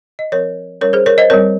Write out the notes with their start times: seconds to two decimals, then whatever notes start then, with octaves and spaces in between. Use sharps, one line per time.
0.19 D#5
0.32 F3 C4 A#4 C#5
0.81 G3 C#4 A#4 C#5
0.93 G#4 C5
1.06 A#4 C#5
1.18 C5 D#5
1.30 G3 C4 A#4 C#5